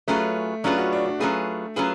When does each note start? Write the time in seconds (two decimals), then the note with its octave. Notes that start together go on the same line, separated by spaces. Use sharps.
0.08 F#3 A3 C#4 F4 G#4 B4
0.64 F#3 C#4 D4 F4 G#4 B4
0.78 F#4
0.93 D4
1.06 D4
1.20 F#3 A3 C#4 F4 G#4 B4
1.76 F#3 C#4 F4 G#4 B4